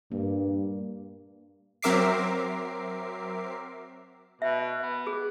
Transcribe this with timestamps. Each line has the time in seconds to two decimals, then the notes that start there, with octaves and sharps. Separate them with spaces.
0.12 G2 A#3
1.83 F#3 C4 A#4 E5 D6 C7
4.42 B2 E5
4.83 B3
5.07 G#4